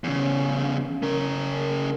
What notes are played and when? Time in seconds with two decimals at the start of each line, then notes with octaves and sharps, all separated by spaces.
0.04 E2 C#3
1.03 C#3 A#4